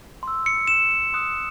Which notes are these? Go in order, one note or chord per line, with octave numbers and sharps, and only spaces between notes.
C6 E6
C#7
E7
C6 D#6 F#6